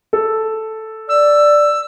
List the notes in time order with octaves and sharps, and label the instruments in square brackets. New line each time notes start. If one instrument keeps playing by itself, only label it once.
[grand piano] A4
[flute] D5 [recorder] E6